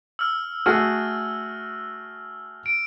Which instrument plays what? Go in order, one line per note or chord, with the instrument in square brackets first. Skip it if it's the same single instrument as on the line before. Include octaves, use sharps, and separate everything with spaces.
[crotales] E6 F6
[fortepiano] A3 F#4 G#4 [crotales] F6
[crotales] D7